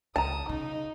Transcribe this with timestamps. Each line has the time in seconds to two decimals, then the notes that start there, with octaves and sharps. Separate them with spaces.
0.16 C#2 A5 A#5 D#6
0.49 C#3 D#4